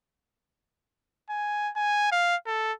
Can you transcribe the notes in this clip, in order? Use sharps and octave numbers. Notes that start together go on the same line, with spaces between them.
G#5
G#5
F5
A4